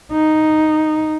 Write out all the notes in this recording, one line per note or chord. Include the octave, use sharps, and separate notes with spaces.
D#4